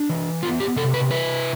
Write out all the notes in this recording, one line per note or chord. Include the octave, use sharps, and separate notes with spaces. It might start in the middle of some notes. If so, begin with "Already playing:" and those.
Already playing: D4
E3
B3 F4
G4
C3 A4
B4
E4 B4